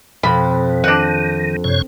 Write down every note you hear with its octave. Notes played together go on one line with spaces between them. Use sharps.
F2 B2 B5
D#3 D4 F#5
F#2 C3 C#5